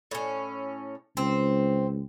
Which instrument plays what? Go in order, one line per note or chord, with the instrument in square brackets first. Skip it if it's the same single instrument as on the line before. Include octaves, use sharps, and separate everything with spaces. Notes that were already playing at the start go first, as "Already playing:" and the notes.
[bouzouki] A2 C#4
[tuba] C#2 [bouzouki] C4